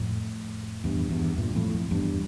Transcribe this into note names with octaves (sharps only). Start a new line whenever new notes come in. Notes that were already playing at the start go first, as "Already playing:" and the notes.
Already playing: F2 A2
E2 G2
E2 G2
G2 A#2
F2 A2
F2
E2 G2